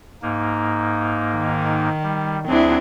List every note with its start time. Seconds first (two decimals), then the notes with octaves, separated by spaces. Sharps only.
0.22 G#2 A#3 D#4
1.36 D#3
2.03 G3
2.48 D2 F#3 C4 D4 E4 G#4